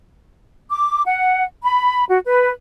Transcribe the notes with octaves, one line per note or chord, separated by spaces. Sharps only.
D6
F#5
B5
F#4
B4